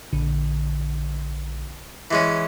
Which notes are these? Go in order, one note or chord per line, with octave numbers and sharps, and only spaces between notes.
A#1 D3
E3 G#3 C#4